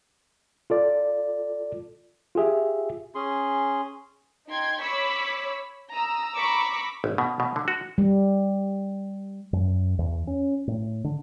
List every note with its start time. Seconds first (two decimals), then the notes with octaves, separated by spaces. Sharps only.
0.70 F4 A4 D5
2.35 F4 G4 G#4 E5
3.15 C#4 G#4 C6
4.48 D#4 G5 C6 G#6
4.82 C#5 B5 C#6 D6 E6 B6
5.91 A#5 D#6 E6
6.35 A#5 B5 C#6 D6 E6
7.04 G#1
7.18 B2
7.40 B2
7.56 D3
7.68 F#4
7.98 G3
9.53 F#2
9.99 E2
10.27 C#4
10.67 A2
11.04 D3